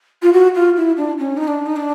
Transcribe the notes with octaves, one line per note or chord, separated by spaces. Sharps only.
F4
F#4
F4
E4
D4
C#4
D#4
D4
D#4
D4